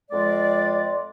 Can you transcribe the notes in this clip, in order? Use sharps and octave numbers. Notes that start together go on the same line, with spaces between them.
F2 G#3 D5